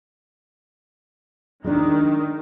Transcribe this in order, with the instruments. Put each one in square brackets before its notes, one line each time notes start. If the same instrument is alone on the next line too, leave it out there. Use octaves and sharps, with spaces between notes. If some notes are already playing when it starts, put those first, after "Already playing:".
[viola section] D#3 [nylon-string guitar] G#3 D4